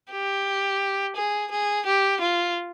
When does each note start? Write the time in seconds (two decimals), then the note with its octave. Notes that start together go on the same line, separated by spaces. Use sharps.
0.12 G4
1.16 G#4
1.51 G#4
1.86 G4
2.21 F4